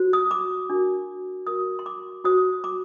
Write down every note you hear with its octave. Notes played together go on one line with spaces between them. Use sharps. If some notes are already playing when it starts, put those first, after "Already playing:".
Already playing: F#4 C5
D#6
D6
D4 F#4 A#4
F#4 A#4 D#6
C6
D6
F#4 C5 D#6
D6